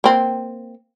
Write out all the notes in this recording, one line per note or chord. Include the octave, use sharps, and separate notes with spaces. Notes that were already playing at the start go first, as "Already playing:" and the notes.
A#3 C4